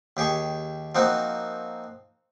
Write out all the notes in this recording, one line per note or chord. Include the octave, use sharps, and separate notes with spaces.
D#2 G4 G#4 C#6
F3 A#3 C4 D#4 F#4